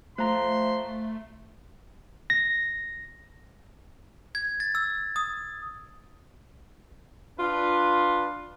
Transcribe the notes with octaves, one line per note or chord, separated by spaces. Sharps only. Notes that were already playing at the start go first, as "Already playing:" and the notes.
F3 A3 A#5 C6 F#6
A#6
G#6
A6
E6
D#6
D4 F4 B4